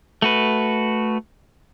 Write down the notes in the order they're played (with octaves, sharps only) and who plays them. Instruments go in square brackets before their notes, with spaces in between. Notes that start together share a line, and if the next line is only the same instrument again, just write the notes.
[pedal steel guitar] A3 F#4 B4